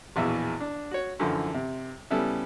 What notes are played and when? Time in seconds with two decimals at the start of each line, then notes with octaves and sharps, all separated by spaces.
0.16 A#1 E2 B2 E3 E5
0.60 D4
0.91 F#4 C#5
1.19 F#2 D3 E3 F3
1.54 C3
2.11 C#3 G3 B3 C#4 E4 A4